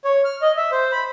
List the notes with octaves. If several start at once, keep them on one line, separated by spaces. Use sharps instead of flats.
C#5
F6
D#5
E5
C5
B5